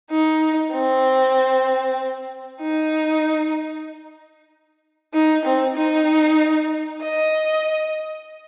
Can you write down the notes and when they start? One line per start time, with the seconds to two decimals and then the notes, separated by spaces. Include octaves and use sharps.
0.11 D#4
0.73 C4
2.61 D#4
5.14 D#4
5.45 C4
5.77 D#4
7.03 D#5